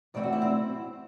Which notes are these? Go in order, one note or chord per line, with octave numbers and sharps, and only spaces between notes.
F#2 E3 A3 C4 D5
F#4
E4
C4